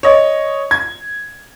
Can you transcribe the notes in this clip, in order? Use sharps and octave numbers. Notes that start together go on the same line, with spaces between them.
C#5 D#5
G#6